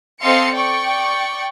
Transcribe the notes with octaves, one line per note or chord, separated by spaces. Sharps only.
C4 A4 D#5 F5 C6 C#7
D5 G5 C#6